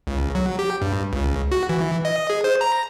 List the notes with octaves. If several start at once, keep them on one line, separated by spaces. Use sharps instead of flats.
C#2
F#3
G4
G2
C#2
F#4
E3
D#5
G#4
C5
A#5